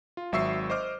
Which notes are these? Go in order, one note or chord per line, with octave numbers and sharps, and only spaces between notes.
F4
G#1 F#3 E5 C#6 E6 C7
C5 D#5 D6 F6